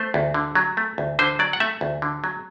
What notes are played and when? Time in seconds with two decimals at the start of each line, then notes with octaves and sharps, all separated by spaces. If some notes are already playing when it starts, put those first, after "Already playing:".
Already playing: A3 C5
0.14 D2
0.34 D3
0.55 F#3
0.77 A3
0.98 D2
1.19 D3 C5
1.39 F#3 D5
1.53 F#5
1.60 A3 E5
1.81 D2
2.02 D3
2.24 F#3